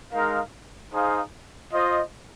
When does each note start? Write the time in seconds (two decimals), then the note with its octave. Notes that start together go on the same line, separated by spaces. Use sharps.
0.13 G#3 D#4 A#4 F5
0.92 D#4 G#4 C5 F5
1.73 F4 C5 D#5